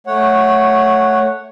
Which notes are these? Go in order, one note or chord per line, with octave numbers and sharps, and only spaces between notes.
A3 C#5 F#5